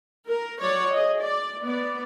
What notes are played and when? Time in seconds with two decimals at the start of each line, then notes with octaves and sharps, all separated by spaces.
0.25 A#4
0.60 F#3 C#5 D5
0.91 G#4 D#5
1.20 D5
1.61 B3 D5